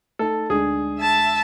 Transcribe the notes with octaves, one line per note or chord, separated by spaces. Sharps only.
A3 D#4 A4
D2 G#3 D4 G#4
E5 A5